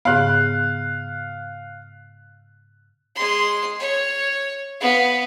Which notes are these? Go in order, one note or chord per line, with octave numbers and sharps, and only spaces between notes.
G#2 C#3 B3 F5 F#6
G#3 C6
C#5
B3 F5